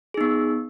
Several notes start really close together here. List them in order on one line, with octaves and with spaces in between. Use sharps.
G#4 D#4 B3